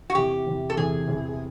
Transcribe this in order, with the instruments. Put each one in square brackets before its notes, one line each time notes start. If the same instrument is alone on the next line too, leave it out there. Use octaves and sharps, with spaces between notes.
[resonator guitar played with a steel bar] F#4
[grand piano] E2 C3 E3 [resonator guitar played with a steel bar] G4
[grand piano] E2 C3 E3
[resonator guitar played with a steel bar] A4
[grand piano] E2 C3 E3 [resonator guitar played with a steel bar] G#4
[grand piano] E2 C3 E3